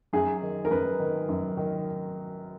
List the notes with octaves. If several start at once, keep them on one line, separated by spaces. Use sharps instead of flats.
F#2 G#4
D#3
A#4
F#2 B4
D#3
F#2
D#3